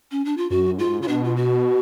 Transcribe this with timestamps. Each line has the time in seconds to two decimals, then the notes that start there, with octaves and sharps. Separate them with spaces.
0.11 C#4
0.25 D4
0.37 F4
0.50 F#2 F#4
0.78 G#2 F4
1.00 C#3 F4
1.07 B2 D4
1.24 F4
1.36 F#4